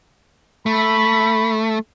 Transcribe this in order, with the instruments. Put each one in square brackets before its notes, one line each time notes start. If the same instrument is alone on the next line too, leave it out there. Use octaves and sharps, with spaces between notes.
[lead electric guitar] A3 [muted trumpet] B5